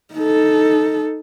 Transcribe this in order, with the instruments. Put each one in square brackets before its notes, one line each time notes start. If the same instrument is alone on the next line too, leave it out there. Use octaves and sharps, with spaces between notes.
[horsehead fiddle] D#4 A4